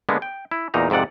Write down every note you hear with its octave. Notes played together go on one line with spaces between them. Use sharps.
D3 G#3 A#3 B3
G5
E4
E2 A#2 D#4 A#5
F2 G#2 C3 D5 F#5